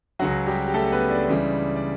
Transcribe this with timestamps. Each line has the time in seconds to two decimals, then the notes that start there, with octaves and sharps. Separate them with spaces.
0.19 C#2 C#3 F#3 F#4
0.47 G3 G4
0.68 G4
0.74 A3 A4
0.92 B3 B4
1.10 D4 D5
1.28 C#2 C#3 E3 G3
1.76 D5